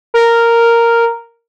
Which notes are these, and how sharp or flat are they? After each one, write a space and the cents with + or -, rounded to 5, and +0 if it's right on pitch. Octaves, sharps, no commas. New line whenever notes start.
A#4 -5